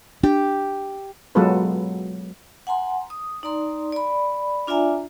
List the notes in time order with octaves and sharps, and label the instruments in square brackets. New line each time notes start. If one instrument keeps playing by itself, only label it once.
[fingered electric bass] D4 [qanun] G4
[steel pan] F#3 G#3 B3 F4 A4 B4
[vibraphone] F#5 G#5 A#5 C6
D#6
D#4 D5 A#5 C6
D5 B5
D4 F4 D5 E5 G#5 A#5